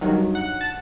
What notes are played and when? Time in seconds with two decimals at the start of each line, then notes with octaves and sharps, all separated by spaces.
0.01 G2 D#3 F#3
0.35 F#5
0.61 A5